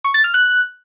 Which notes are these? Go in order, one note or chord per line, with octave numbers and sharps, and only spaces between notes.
C#6
A6
F6
F#6